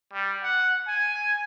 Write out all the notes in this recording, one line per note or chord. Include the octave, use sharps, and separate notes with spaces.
G3
F#5
G#5